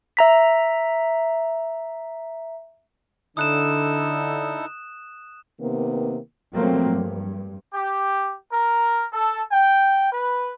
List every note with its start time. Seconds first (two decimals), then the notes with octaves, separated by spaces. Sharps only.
0.17 E5 A#5 B6
3.37 D3 D#4 E4 A4 D#6 F#6 E7
5.60 C3 D#3 A#3 B3
6.56 B2 F3 F#3 A3 A#3 C4
6.91 G2
7.74 G4
8.52 A#4
9.13 A4
9.52 G5
10.13 B4